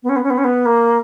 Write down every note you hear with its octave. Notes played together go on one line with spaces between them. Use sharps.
B3
C#4
B3
C#4
B3
C#4
B3
A#3